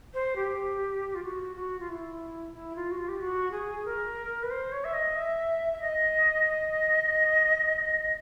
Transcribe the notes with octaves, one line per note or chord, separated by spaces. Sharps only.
C5
G4
F4
F#4
F#4
F4
E4
E4
F4
F#4
F4
G4
F#4
G#4
A#4
B4
C5
C#5
E5
D#5
E5
E5
D#5
D#5